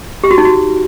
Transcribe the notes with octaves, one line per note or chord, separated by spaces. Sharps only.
G4
F#4
D#4
F#4